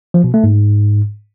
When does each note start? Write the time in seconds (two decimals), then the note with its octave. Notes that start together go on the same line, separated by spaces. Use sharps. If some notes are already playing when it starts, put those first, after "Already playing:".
0.14 F3
0.24 B2
0.34 A3
0.44 G#2